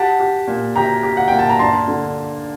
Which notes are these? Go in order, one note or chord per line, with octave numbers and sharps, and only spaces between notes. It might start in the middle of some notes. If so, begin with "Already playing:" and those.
Already playing: G4 F#5 A5
G4
A#2
G4 G5 A#5
G4
F#5
A#2 G5
A5
A#5
G2 A5 C6
D3